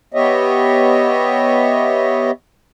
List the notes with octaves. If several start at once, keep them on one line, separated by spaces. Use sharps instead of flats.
B3 G4 C#5 D#5 E5